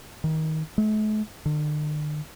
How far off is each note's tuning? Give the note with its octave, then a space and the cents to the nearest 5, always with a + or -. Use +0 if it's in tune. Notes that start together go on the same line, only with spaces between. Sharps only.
D#3 +20
A3 -45
D3 +45